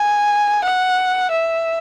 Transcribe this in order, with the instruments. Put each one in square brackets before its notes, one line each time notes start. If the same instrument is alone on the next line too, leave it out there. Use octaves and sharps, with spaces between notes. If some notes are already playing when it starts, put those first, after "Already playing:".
Already playing: [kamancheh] G#5
F#5
E5